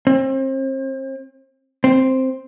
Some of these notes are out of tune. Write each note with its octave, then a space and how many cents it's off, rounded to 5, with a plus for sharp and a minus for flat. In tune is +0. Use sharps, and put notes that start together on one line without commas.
C4 +35
C4 +0